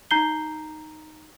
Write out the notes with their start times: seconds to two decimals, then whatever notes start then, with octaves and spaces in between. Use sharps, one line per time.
0.11 D#4 A#5 G6 C7 G7